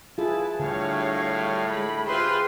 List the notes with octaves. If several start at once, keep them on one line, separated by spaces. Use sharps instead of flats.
E4 F4 G#4 B4 A5
A2 D3 G3 C#5 F5
G#3 B5
F4 G4 G#4 B4 C5 E5 C6